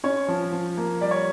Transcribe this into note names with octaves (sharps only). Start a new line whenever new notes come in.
C#4 C#5
F3
F3
A#3
G3 D5
C#5